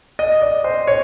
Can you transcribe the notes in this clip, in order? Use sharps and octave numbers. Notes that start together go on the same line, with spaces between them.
D#5
D5
C5
C#5